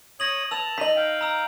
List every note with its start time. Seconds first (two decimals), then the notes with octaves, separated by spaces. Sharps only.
0.20 C#5 D#6 A#6 F#7
0.51 B4 A5 E6 F7
0.78 D#4 D#5 B6 D#7 F#7
0.96 F5 G5
1.21 A#5 E6